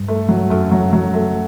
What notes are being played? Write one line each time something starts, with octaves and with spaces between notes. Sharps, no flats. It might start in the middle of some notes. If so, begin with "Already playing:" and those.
Already playing: G2
A3
F#3
F#2 A3
F#3
F#3
A3